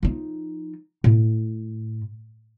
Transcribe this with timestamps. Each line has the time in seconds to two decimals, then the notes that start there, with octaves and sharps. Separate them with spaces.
0.03 F3 D#4
1.04 A2